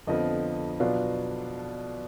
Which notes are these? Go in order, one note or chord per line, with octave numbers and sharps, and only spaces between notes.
F2 D3 F3 B3 D#5
B2 F#3 B3 D4 F4